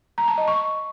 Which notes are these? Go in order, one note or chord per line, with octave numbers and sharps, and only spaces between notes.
A#5
A5
D#5
C#6